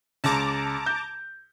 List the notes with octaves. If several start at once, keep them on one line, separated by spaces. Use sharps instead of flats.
C#2 A5 A#5 D6
G6